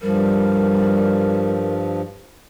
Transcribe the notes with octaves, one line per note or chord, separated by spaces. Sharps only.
G2 F3 G3 A#4